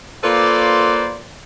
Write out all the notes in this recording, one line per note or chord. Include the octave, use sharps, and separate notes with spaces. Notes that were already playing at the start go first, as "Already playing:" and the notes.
A#3 F4 A4 B4 C5 D5